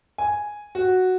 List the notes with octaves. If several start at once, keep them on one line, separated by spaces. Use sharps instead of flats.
G#5
F#4